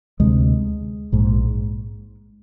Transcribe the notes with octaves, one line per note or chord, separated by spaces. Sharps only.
D2 C3 G#3
A#1 G#2